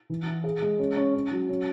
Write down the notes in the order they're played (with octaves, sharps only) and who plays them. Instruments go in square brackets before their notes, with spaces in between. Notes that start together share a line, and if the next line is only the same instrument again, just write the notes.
[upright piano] E3
E4
G#4
G#3
C#4
C#4
C#4
F#3
C#4